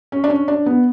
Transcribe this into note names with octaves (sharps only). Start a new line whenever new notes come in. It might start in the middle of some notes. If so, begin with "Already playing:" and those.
C#4
D4
C#4
D4
B3